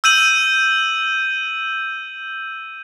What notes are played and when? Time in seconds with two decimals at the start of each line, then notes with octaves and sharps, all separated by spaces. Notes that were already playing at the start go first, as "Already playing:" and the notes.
0.04 E6 G6 D#7 F#7